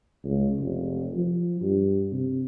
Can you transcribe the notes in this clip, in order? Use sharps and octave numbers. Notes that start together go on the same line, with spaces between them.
C#2
F1
F3
G2
C3